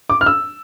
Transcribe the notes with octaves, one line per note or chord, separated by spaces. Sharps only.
D6
F6
E6